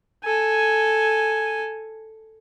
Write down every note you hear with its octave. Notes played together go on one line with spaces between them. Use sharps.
A4 G#5